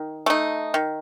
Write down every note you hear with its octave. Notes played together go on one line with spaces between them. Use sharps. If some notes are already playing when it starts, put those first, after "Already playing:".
Already playing: D#3
A3 D#4
D#3